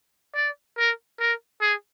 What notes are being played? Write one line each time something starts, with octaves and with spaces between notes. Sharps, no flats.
D5
A#4
A#4
G#4